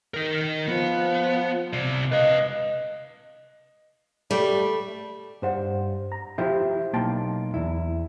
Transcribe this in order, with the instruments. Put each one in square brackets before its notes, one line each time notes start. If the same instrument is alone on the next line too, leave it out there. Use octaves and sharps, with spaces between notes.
[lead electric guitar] D#4 A#4
[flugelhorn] F3 [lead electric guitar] B3
[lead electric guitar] C3 D5
[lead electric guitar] B4 F5 [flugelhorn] D#5
[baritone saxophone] G3 [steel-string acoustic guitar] A3
[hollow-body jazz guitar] G2 C5 F#5
A#5
F3 E4 F4 G4 C5 E5
B1 A#3 G5 A5 C6
E2 E4